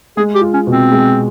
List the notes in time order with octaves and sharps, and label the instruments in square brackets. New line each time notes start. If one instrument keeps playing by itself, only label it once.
[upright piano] G#3 [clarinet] G#4
[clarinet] G4
[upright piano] F4
[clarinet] C#4
[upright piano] B2
[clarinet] C4
[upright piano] G#3